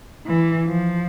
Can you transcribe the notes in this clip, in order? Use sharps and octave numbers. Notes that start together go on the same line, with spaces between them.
E3
F3